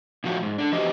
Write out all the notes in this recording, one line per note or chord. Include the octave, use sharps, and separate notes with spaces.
A#2 F3 F#4
G#2
D3 D4
E2 F3 F#4 G4 C5 D#5